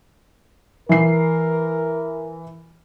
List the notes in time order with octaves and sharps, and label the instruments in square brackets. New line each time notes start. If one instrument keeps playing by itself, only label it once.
[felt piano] E3 C7 [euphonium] A#4